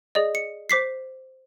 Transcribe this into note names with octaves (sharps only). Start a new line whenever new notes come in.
G#4 D5 D#5
C#7
C5 D6 B6 C7